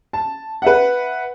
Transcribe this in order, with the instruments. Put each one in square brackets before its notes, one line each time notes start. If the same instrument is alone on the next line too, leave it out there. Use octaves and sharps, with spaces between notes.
[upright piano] A5
B4 E5 F#5